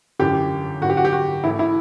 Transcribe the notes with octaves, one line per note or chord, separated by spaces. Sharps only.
G1 F#2 E3 G4
G1 F#2 E3 F#4
G4
F#4
G4
F#4
A1 A2 E3 E4
E4